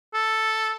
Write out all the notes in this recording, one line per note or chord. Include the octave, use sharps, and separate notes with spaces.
A4